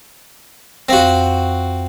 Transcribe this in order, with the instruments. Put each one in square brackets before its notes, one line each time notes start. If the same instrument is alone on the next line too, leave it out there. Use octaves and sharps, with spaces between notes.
[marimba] F2 F5 A#6 [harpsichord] C4 F#4